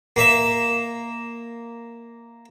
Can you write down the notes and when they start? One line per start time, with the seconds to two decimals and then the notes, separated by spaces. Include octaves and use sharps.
0.16 A#3 E5